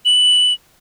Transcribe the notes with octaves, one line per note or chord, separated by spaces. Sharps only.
F#7